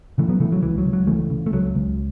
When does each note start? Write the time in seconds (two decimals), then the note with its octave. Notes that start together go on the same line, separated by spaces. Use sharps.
0.18 C#3 E3 A3
0.29 F#3 B3
0.40 C#3 E3 A3
0.52 F#3
0.63 C#2 E3
0.78 F#3
0.86 C#2
0.93 F#3
1.07 C#3 E3 A3
1.30 C#3
1.46 A3
1.53 C#2 F#3
1.75 C#2